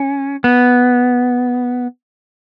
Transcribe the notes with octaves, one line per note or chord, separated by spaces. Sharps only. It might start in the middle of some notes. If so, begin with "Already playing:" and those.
Already playing: C#4
B3